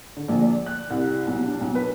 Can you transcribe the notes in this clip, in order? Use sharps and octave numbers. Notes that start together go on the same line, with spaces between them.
D3
A#1
D5
F#6
C2
B1
D4
B1
B4